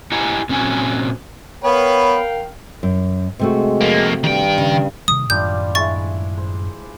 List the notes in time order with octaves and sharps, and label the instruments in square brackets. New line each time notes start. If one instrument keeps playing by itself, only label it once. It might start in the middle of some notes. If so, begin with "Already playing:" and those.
[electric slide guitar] E4 G4 D#5 F#5 G#5 A#5
A#2 C4 C#4 F#4 G#5
[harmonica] B3 B4 [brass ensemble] A#4 F5 G5 [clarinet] C#5
[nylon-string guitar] F#2
[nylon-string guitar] C3 A3 F#4 [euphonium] G#3
[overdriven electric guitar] F2 A#3
[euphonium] G2 [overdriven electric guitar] D#3 G5
[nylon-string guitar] C#3
[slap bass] C3 D#3 G3 [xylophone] D#6
[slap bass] F#2 A2 D#3 [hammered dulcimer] G3 D4 F4 [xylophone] G6
[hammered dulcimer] G#3 E4 [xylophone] C#6 A6
[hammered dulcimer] C5